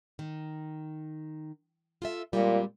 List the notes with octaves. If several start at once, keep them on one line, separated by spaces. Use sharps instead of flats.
D#3
F4 A4 E5
A#2 G3 G#3 C4